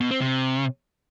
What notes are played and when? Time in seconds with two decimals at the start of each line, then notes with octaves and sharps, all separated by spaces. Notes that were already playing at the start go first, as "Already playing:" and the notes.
0.01 B2
0.11 C4
0.21 C3